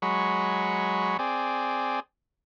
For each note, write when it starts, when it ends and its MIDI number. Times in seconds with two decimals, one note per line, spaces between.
0.02 1.17 54
0.02 1.17 56
0.02 1.17 83
0.02 1.17 85
1.19 2.00 60
1.19 2.00 68
1.19 2.00 74